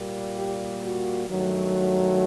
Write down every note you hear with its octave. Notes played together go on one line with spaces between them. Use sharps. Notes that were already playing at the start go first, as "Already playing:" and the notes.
Already playing: A#2 G3 A#3
G4
F#4
G2 D#3 F#3 A3